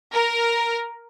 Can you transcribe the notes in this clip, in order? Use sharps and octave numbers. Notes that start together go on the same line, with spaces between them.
A#4